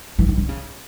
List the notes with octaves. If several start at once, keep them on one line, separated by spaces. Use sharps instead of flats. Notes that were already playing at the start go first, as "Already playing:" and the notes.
E3
D#3
D3
C#3